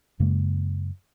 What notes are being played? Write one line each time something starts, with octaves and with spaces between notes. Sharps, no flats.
F#2 C#3 G#3 A#3